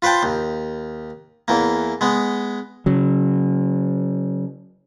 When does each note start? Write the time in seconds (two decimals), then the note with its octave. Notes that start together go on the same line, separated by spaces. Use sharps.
0.02 F4 B4 C5 G5 A5
0.23 D#2
1.48 E2 E3 A#3
2.01 G#3 B3
2.86 C#3 F#3